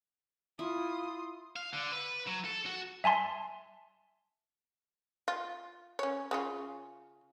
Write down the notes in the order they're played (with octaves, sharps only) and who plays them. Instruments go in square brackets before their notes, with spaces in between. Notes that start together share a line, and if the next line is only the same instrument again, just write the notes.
[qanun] E4 [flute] F4 [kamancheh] C6 D#6
[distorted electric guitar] F5
D3
B4
F#3
A4
F#4
[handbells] E5 G#5 A5 C6
[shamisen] F4
C#4 C#5
C#3 C#4 F4